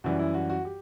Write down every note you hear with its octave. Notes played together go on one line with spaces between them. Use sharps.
F#2 E3 G3 F#4
E4
F#4
F#4
G4